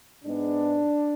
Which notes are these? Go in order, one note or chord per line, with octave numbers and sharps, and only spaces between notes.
G#2 G#3 B3 D4